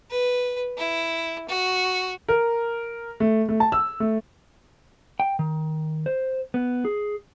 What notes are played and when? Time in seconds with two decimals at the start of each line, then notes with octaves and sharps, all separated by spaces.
0.11 B4
0.78 E4
1.49 F#4
2.28 A#4
3.20 A3
3.49 A3
3.60 A5
3.72 E6
4.00 A3
5.20 G5
5.39 D#3
6.06 C5
6.54 B3
6.85 G#4